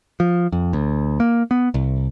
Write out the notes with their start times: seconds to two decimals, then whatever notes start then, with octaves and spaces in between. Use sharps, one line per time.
0.20 F3
0.52 F2
0.73 D2
1.20 A#3
1.51 B3
1.74 C2